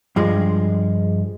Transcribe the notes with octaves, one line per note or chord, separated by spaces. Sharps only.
G2 F3 G#3